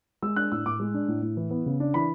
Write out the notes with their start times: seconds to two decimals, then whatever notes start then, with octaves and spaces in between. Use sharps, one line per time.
0.22 G#3 E6
0.36 D4 F#6
0.52 A2 E6
0.66 A2 D6
0.80 G#3
0.94 D4
1.08 A2
1.22 A2
1.37 E3
1.51 B3
1.66 C#3
1.80 D4
1.94 E3 B5